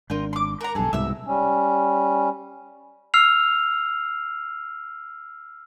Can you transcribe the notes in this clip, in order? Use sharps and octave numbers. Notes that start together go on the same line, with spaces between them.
G#1 D4 F4 A#4 G5
C6 D6
A#4 F#5 A#5
B1 G2 G#4 A4
C2 G#2 B2 E5 E6
G3 C#4
E6 F6 C7 F7